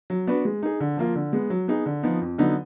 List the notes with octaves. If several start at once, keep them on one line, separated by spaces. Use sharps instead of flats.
F#3
B3 D4 F#4 B4
G#3
D#4 G#4
D3
F3 A#3 F4
D3
G#3 B3
F#3
B3 D#4 G#4
D3
F3 B3 D#4
F2
D3 F#3 B3 D#4